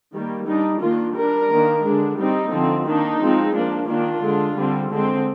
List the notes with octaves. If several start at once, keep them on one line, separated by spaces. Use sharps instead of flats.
D#3 G3 A#3
G3 D4 D#4
D#3 A#3 D4 F4
G3 D4 A#4
D#3 A#3 D4
D3 G#3 D4
G3 C4 D#4
D3 F3 C4
D#3 A#3 D4 D#4
F3 G#3 C4
F3 A#3 D4
D#3 A#3 D4 F4
D3 G#3 D4
D3 G3 C4
D3 G#3 C4